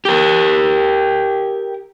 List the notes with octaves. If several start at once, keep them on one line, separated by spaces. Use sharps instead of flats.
G4 A#4